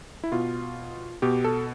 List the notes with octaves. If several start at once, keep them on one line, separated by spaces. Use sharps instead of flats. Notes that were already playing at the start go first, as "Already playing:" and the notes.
E4
B2 F4
B2 G4
A4